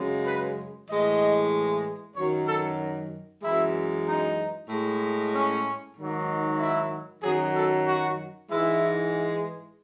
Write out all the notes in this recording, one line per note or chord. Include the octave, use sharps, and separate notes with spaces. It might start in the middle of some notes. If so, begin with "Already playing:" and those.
Already playing: F#2 C#3 G#3
B4
A2 E3 G#3 D#5
F#2 D#3 F#3 C#5
A4
F#2 E3 G#3 E4
D#4
A2 G#3
C#4
G#2 D#3 F#3
E4
F#2 D#3 F#3 G#4
A4
F#4
G#2 E3 G#3 E4